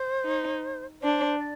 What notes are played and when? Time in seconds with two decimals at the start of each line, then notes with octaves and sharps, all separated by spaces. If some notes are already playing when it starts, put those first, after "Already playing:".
Already playing: C5
0.24 D#4
1.01 D4 C5
1.39 D5